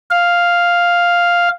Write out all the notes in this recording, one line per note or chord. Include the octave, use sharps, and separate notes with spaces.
F5